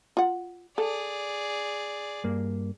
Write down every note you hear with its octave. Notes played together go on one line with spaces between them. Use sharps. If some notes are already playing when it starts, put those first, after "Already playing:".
F4 F#5
G#4 A4 D5
G2 A#3